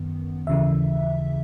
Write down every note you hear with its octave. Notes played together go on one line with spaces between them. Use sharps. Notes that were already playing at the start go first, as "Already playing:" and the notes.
Already playing: F#2 D#3 B3
D#2 C#3 E3 E5